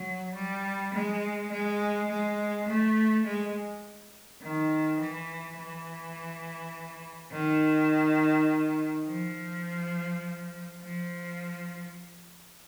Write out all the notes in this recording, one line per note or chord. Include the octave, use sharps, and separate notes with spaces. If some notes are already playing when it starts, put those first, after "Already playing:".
Already playing: F#3
G3
G#3
G#3
G#3
A3
G#3
D#3
E3
E3
D#3
F3
F3